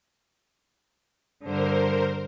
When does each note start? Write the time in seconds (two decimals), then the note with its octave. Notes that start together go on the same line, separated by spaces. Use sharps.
1.44 G2 D3 A#4 C5